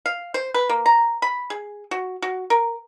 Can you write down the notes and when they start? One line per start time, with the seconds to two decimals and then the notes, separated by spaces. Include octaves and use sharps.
0.06 F5
0.34 C5
0.54 B4
0.69 A#3
0.86 A#5
1.22 B5
1.50 G#4
1.91 F#4
2.22 F#4
2.50 A#4